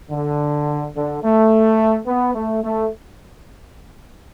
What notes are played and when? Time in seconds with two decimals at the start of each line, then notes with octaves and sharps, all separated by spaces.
0.10 D3
0.95 D3
1.23 A3
2.07 B3
2.35 A3
2.63 A3